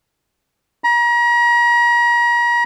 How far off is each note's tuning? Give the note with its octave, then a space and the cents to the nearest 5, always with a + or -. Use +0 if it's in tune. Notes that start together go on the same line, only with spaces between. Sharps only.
A#5 +35